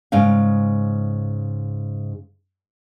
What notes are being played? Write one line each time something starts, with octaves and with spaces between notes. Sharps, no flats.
G#2 C#3 F5